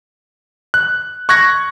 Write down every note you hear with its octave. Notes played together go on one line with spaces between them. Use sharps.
F#6
C#6 F#6 G#6 A#6